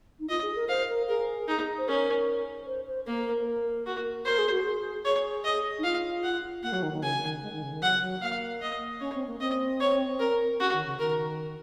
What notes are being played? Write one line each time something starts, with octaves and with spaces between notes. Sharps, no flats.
D#4
F4 D#5
G#4
A#4
C5 F5
A#4
G#4 A#4
D#4
C5
C#4 A#4
C5
C5
A#3 A#4
A#4
A#4
F#4
A#4 C5
G#4
F#4
G#4
G#4 C#5
D#5
D#4
F4 F5
F#5
A#3 F#5
F#3
D#3
D#3
C#3 G#5
D#3
G#3
D#3
C#3
D#3
F#3 F#5
F#3
A#3 F5
D#5
C#4 C#5
C4
A#3
C4 D#5
C#5
A#4
C#4 F#4
D#3
C#3
D#3 A#4